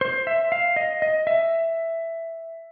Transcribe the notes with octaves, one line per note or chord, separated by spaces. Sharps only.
C5
E5
F5
D#5
D#5
E5